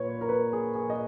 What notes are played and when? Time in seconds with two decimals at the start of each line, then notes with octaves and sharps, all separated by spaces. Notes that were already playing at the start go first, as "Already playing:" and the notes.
Already playing: A#2 B4 C#5
0.21 A#4
0.29 B4
0.53 G#4
0.75 G#4
0.90 D#5